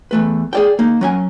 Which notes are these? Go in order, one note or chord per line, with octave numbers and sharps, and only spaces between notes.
E2 A3 B4
G#4 D5 G5
A#3 D#4
F#3 C#4 G#5